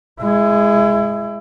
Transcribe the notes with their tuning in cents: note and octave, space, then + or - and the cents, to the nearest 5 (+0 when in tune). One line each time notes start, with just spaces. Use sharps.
G#3 +0 E4 +30